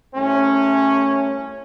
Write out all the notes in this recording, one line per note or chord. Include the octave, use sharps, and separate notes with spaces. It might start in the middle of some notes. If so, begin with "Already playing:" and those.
C2 A3 C#4